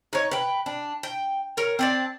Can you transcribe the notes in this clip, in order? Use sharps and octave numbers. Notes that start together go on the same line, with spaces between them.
D#4 C#5
B4 G5
D4
G5
A#4 C#5
C4 D4 D5